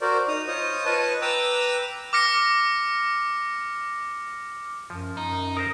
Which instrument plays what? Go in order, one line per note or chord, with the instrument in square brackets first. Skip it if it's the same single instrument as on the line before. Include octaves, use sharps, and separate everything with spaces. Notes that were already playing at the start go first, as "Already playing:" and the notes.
[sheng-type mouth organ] F#4 A#4 C5 D5
D#4 A#5 D#6
F4 C5 C#5 D#5 D#6
B4 C#5 D#5 A5
B4 G5 A#5 D6 E6
[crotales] D6 F6 A#6 C#7
[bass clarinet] F#2 [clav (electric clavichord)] F3
[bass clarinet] F#2 [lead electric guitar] D#4
[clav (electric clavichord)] A#4 C5 [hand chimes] D#6 A#6